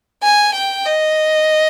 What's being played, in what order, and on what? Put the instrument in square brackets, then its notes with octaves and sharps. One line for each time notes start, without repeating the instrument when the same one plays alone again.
[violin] G#5
G5
D#5